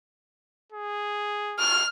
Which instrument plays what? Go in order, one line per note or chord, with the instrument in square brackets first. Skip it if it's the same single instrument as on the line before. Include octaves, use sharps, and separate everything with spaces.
[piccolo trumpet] G#4
[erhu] F6